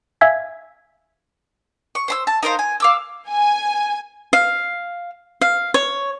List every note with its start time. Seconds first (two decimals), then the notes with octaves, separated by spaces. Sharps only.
0.21 E5 F5 G#5 E6 G#6 B6
1.95 C#6
2.08 C5 C6 E6
2.27 A5
2.43 D#4 A#4 C5 F5
2.59 G#5
2.80 F5 D6 E6
3.29 G#5
4.33 F5
5.41 F5
5.74 C#5